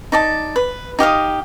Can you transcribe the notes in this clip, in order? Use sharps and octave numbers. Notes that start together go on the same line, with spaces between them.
D#4 D5 A5
B4
D#4 G4 F5 D#6